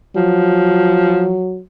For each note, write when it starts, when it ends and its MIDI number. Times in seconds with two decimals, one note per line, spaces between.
0.16 1.39 53
0.16 1.61 54